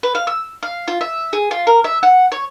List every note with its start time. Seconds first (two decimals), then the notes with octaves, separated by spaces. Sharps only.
0.03 B4
0.15 F5
0.27 E6
0.63 F5
0.88 F4
1.01 E5
1.33 G#4
1.51 F4
1.67 A#4
1.84 E5
2.03 F#5
2.32 C#5